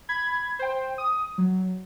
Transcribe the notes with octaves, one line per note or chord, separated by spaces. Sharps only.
B5 G#6
C5 G5
D#6
F#3